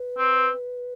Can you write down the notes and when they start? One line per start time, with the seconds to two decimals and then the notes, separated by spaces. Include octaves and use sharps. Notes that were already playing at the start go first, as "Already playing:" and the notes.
Already playing: B4
0.18 C4